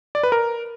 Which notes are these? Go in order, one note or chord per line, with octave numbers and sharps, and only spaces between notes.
D5
B4
A#4